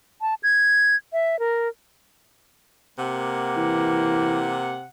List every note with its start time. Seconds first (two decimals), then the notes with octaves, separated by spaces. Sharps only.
0.21 A5
0.43 G#6
1.13 E5
1.39 A#4
2.99 C3 A#3 F#5
3.56 E3